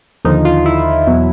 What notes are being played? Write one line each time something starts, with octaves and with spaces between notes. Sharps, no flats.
D#2 D3 F3 D#4
F4
E4
E2 B2 F#3